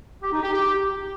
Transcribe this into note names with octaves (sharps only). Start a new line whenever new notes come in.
G4
D#4
G4
G4